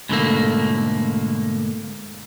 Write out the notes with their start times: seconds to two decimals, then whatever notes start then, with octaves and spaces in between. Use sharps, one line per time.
0.09 G#2 B2 D3 F3 A3 A#3